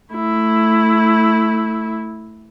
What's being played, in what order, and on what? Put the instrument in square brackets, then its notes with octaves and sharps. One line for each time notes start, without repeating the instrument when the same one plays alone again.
[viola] A3 E4